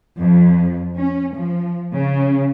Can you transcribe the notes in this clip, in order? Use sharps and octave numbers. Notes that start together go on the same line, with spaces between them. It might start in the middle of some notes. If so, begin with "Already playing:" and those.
F2
C#4
F3
C#3